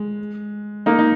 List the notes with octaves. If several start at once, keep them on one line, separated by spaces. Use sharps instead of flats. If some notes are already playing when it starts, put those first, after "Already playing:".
Already playing: G#3
A#3 D#4
D#4